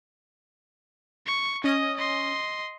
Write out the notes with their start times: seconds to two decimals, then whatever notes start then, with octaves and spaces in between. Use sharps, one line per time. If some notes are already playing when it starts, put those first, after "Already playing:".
1.27 C#6
1.64 C#4 D#5 D#6
1.97 D#5 C6